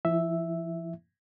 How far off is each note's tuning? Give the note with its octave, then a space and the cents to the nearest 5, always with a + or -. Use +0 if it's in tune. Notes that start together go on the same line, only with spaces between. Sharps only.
F3 -40 E4 +0 E5 +0